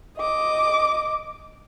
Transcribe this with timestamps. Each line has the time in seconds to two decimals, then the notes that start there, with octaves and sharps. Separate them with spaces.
0.17 D#5 D6